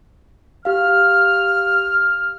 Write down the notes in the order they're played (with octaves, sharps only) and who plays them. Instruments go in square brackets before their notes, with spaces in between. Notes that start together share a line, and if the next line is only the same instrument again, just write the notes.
[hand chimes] G4 F5 [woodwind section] F6